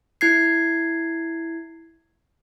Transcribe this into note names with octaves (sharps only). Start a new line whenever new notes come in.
E4 G#6 C7